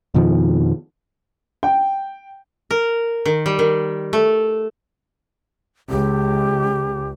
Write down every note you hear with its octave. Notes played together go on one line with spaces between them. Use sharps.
F2 B2 D#3 F3
G5
A#4
D#3
G3
D#3
A3
C#2 G4